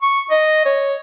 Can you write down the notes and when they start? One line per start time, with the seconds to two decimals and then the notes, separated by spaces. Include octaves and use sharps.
0.02 C#6
0.31 D#5
0.66 C#5